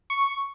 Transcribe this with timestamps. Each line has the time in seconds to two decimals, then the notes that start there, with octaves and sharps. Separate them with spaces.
0.10 C#6